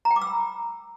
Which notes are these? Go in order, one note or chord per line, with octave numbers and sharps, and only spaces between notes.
A#5
G5
D6
E6
B5